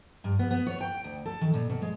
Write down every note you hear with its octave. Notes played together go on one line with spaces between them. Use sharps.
G2
B3
B3
C#5
G5
D2
A4
D#3
A#2
B2
G#3